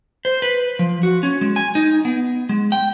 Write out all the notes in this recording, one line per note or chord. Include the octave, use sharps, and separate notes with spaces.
C5
B4
F3
F#4
C#4
G#3
G#5
D#4
B3
G#3
G5